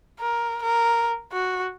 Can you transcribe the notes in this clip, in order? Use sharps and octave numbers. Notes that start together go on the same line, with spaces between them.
A#4
A#4
F#4